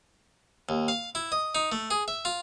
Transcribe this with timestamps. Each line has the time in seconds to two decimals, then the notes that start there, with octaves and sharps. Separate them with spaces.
0.69 D#2
0.88 F5
1.15 E4
1.32 D#5
1.55 D#4
1.72 A3
1.91 G#4
2.08 E5
2.25 F4